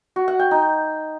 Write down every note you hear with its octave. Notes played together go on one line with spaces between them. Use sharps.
F#4
F#5
G5
D#4